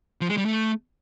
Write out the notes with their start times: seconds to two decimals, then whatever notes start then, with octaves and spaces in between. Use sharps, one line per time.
0.21 F3
0.29 G#3
0.37 G3
0.46 A3